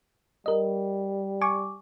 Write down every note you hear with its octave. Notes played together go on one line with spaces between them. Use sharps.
G3 A#4 D#5
G#5 C#6 D6